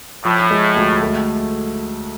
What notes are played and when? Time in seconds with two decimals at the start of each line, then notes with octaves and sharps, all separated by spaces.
0.24 A2 F3
0.51 G#3
0.76 D2
1.02 A3